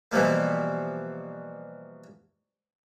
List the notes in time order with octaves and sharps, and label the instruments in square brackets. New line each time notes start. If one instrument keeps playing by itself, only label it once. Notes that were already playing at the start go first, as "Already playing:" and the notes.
[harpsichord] B2 E3 F3 G3 A#3